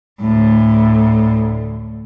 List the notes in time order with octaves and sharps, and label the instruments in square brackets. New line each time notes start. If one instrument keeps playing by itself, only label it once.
[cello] D2 A2